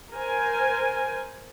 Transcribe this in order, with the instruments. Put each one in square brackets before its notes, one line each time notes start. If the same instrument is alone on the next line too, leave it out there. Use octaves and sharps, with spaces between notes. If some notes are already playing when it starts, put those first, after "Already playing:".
[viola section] A#4 C5 G#5